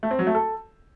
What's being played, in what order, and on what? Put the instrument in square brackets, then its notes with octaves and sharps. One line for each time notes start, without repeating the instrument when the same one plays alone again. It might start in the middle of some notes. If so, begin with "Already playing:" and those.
[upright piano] A3
C4
F#3
A3
A4